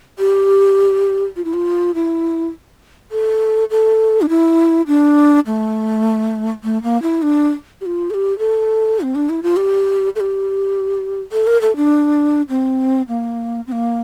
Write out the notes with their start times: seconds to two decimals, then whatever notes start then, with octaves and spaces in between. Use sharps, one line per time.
0.19 G4
1.36 F4
1.45 E4
1.54 F4
1.95 E4
3.12 A4
3.71 A4
4.22 D4
4.29 E4
4.87 D4
5.46 A3
6.64 A3
6.83 A#3
7.02 E4
7.22 D4
7.81 G4
7.86 F4
8.10 A4
8.14 G4
8.39 A4
9.01 C4
9.15 D4
9.29 E4
9.43 F4
9.57 G4
10.16 A4
10.20 G4
11.32 A4
11.47 A#4
11.61 A4
11.76 D4
12.49 C4
13.08 A#3
13.67 C4
13.72 A#3